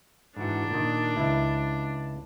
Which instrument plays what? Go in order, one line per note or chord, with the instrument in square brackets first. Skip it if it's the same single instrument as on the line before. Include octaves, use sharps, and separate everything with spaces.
[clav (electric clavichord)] G#2 E3 F#4 [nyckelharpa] D4
[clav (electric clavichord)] A#2 D#3
C#2 E4 E5